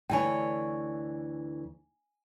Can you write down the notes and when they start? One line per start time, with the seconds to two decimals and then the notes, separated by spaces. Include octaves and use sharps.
0.10 D2 E3 C#5 G5 G#5